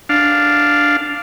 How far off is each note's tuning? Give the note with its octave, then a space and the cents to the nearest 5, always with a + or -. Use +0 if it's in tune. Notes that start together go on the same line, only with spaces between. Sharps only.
D4 +0 F5 +0